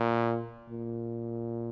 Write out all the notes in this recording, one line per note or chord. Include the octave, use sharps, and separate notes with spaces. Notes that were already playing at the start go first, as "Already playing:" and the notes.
Already playing: A#2
A#2